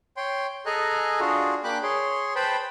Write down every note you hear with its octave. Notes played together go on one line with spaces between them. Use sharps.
C#5 G5 C6
G#4 A4 D#5 G#5 A#5 F#6
D4 F4 F#4 G#4
A#3 D4 G5 B5 D6 F#6
G#4 C#5 C6
B4 C5 G5 A5 B5